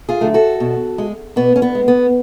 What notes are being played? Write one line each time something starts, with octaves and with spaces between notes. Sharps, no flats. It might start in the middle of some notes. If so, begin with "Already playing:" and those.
F4 G#4
D3 F#3 A3
F#4 A4
B2
G#3
B2 B3
C#4
B3
G#3
B3